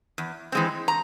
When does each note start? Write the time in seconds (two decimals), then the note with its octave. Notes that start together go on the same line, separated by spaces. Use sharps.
0.18 E2
0.52 E3 G#3 C4
0.88 A#5